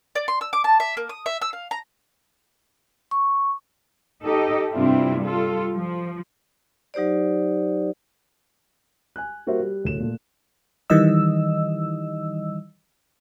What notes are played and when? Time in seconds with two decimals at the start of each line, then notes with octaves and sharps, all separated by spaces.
0.15 D5
0.28 C6
0.41 E6
0.53 D6
0.64 A5
0.80 E5
0.97 A#3
1.09 D#6
1.26 E5
1.41 E6
1.53 F5
1.71 A#5
3.11 C#6
4.23 D#4 G4 A4 D#5
4.73 G2 C3 C4 D4 E4 F4
5.20 G3 F4 A4
5.73 F3
6.94 F#3 D#4 G4 C5 D5
9.16 G#5 F#6
9.47 G3 A#3 F#4 A#4 C5 E5
9.60 G3
9.84 D1 C#3 C#4 E7
10.00 A#2 A3
10.90 D#3 E3 G3 D#5 E6